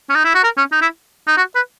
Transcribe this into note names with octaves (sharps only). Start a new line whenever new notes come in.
C#4
D#4
E4
F#4
A#4
C#4
D#4
E4
D#4
F#4
B4